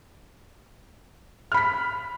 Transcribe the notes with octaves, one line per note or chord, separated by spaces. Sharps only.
B5 F6 B6